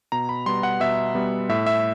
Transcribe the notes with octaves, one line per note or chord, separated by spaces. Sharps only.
B2 A#5
B5
G3 B3 C6
F#5
B2 E5
G3 B3
A2 E5
E5